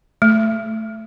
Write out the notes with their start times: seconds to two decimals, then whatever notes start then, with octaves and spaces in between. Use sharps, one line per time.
0.22 A3